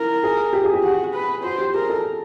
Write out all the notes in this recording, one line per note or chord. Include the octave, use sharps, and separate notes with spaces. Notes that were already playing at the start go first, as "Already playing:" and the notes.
Already playing: E4 A#4
G#4
G4
G#4
G4
F#4
B4
F#4 C5
G4
G#4 A#4
A4